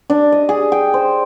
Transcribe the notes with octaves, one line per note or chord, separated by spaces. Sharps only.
D4
D#5
G#4
G5
C5